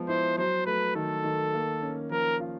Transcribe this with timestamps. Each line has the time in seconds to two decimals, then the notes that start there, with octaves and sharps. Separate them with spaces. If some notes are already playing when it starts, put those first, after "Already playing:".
Already playing: F3 G#3 B3
0.08 E4 C5
0.38 F#3 C5
0.66 A3 B4
0.95 D#3 A4
1.24 D#3
1.53 A#3
1.82 C#4
2.10 F3 A#4
2.40 F4